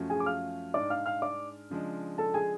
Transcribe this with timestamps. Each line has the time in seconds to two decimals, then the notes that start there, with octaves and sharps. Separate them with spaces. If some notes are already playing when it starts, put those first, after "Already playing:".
Already playing: F#2 F3 A3 C#4 F#4
0.10 G#4 G#5
0.20 D6
0.26 F5 F6
0.74 G#2 G#3 D4 D5 D6
0.90 F5 F6
1.06 F5 F6
1.22 D5 D6
1.70 C#3 F3 G#3 D4
2.18 A4 A5
2.34 G#4 G#5